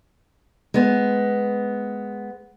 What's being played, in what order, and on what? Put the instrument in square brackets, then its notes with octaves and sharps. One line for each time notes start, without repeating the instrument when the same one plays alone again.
[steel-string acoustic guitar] G#3 B3